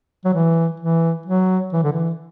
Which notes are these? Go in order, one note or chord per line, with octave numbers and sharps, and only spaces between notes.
F#3
E3
E3
F#3
E3
D3
E3